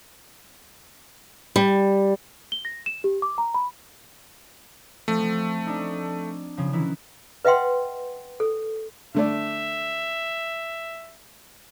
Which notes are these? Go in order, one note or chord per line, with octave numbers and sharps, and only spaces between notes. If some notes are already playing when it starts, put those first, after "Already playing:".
G3
G7
A#6
E7
G4
D6
A#5
B5
F3 A3 C4
D4 D#4
C#3 F3
D#3 E3 E4
B4 D#5 E5 F#5 G5 C6
A4
D3 A3 D5 E5